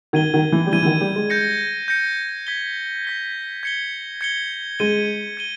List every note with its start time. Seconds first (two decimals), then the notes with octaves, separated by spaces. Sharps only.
0.13 D#3 G#6 D#7 G7
0.34 D#3
0.52 E3
0.66 G3
0.72 E3 G#6 D#7 G7
0.83 E3
0.86 D#3
1.01 G3
1.16 G#3
1.30 G6 A#6 C#7
1.88 G6 A#6 C#7
2.47 G#6 B6 G7
3.05 G#6 B6 G7
3.63 G#6 C#7 G7
4.21 G#6 C#7 G7
4.79 G#3 G#6 D#7 G7
5.37 G#6 D#7 G7